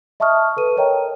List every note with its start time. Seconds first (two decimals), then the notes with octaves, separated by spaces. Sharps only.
0.20 D#5 E5 A5 C#6 D#6 F6
0.57 A4 B4 D#7
0.77 A#4 C#5 D#5 G5 A#5